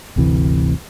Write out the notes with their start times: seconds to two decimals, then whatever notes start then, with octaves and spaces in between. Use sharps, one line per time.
0.16 G1 D2 C3 E3